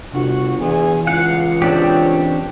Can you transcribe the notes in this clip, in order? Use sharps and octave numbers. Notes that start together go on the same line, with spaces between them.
G1 C3 F#4
E2 E3 G#5
C#2 F5 F#5
C4 D4 G4 C#5